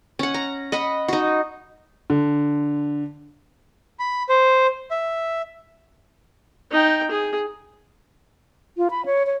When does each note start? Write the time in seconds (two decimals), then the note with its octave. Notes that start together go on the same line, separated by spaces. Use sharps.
0.19 C#4 F#5
0.34 A#5
0.72 D#5 F#5 B5
1.08 D#4 F#4
2.10 D3
3.99 B5
4.29 C5
4.91 E5
6.71 D#4 G5
7.11 G#4
8.77 F4
8.91 B5
9.06 C#5
9.27 C#5